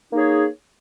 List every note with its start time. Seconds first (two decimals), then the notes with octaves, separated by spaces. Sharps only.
0.12 A#3 D#4 G#4 C#5